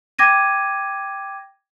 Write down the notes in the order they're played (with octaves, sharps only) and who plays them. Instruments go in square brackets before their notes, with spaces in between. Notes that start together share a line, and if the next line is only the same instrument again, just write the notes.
[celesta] G5 D6 G#6 A#6 D#7